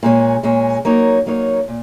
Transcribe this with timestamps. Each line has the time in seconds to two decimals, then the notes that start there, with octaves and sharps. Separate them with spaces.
0.03 A#2 G#3 C#4
0.43 A#2 G#3 C#4
0.85 F#3 A#3 D#4 A#4 C#5
1.26 F#3 A#3 D#4 A#4 C#5
1.68 A#2